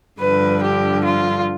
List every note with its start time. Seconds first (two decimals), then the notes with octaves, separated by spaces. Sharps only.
0.20 G2 D3 F3 B4
0.62 G4
1.04 F4